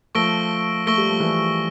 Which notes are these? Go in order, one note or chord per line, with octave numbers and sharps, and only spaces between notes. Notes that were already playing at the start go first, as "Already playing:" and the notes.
F3 A3 C#6 E6 A#6 D7 G7
A3 C#6 E6 A#6 D7 G7
G3
F3
E3 G3